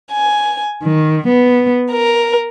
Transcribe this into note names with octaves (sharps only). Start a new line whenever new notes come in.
G#5
D#3
B3
A#4